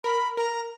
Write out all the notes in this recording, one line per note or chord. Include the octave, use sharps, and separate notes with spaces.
A#4 B5
A#4 A#5